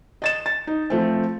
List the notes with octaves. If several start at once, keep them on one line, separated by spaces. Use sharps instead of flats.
D#5 A6 E7
A6
D#4
F3 A3 C4